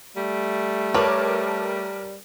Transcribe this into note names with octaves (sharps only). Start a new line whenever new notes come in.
G3 A3
A#4 B4 C#5 A5 D6